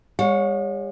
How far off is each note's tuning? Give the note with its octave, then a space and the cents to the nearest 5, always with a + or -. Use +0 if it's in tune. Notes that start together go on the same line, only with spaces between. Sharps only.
G3 +45 C#5 +0 F#5 -45